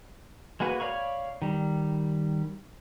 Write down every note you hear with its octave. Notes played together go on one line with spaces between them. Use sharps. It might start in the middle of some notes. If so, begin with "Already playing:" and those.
G#3 A#3 F#4 B4
C#5 D5 F5 B5 C#6
D#3 G3